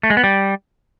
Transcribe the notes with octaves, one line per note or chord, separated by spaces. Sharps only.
A3
G#3
B3
G3